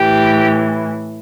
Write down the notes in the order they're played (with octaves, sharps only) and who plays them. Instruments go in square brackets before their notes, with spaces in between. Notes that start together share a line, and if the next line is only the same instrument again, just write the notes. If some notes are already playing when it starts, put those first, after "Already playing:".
Already playing: [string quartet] A2 E3 G4